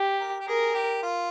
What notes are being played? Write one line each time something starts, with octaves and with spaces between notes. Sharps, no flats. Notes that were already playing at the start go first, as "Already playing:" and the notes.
Already playing: G4
A#4
G4
G#4 A#4
G4
F4